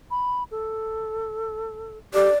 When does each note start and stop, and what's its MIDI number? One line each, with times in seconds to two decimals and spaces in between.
0.11 0.43 83
0.51 1.98 69
2.14 2.29 67
2.14 2.30 69
2.14 2.37 74